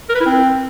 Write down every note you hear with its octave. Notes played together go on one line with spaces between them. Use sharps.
A#4
B4
E4
C4